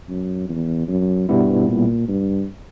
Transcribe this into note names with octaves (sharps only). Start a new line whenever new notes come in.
F#2
E2
F#2
G2 B2 G3 B3 E4
A#2
G2